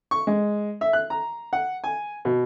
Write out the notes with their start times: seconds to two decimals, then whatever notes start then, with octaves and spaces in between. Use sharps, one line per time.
0.11 C#6
0.27 G#3
0.81 E5
0.93 F#6
1.10 A#5
1.53 F#5
1.84 G#5
2.25 B2